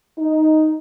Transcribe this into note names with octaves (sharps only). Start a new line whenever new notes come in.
D#4